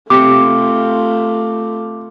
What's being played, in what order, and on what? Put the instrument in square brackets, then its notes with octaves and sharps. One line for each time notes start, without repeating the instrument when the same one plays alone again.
[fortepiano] C3 G4 [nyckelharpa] A3 F4 [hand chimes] D6 C#7